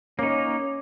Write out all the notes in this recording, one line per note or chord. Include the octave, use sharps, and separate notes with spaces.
A#3 C#4 D#4 C#5 D6